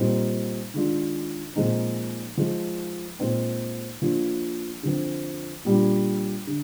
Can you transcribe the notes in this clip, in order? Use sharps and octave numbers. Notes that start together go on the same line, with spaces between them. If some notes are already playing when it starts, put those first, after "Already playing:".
Already playing: A#2 G3 C4 D#4
D#3 G#3 D4 F4
A#2 F3 G#3 C4 D#4
F3 G#3 D#4
A#2 G#3 C4 D#4
F3 A#3 D4 F4
D3 F3 C4
A#2 G3 D4 F4
D3